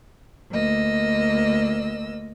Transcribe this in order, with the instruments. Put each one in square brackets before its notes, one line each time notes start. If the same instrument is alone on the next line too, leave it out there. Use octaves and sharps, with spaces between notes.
[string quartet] D2 A#3 D#5 E6